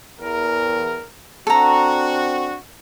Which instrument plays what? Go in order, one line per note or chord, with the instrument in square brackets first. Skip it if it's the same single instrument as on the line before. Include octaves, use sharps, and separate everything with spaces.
[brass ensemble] E2 A#4
[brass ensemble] C4 D4 F#4 [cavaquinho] A4 A#5